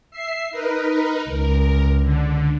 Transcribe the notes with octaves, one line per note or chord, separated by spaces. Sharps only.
E5 C7
D#4 A#4 B4
C#2 A#4
D3